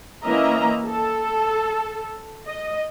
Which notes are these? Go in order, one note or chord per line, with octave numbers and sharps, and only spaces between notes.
E3 A#3 C#4 D#5 E5 A#5
A4
D#5